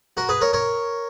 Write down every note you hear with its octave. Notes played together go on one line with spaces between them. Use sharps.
F#4 A#4
G#4 B4
A#4 C#5
A#4 C#5